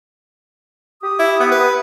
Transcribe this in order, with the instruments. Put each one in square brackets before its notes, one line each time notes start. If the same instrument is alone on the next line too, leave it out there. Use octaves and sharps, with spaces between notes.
[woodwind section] G4 D#6
[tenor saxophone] E4
B3
B4